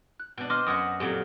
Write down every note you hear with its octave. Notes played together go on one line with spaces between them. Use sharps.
F#6
B2 D4
C5 D#5 C6 D6 F6
F#2 F#4 F#5 D#6
F2 A#2 F#3 G4